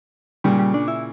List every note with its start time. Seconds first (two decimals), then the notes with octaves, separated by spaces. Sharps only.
0.44 A#2 C#3 G3
0.59 G3
0.74 D4
0.88 E4